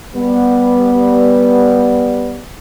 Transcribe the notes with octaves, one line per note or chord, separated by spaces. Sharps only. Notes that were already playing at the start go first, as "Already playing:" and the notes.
G3 B3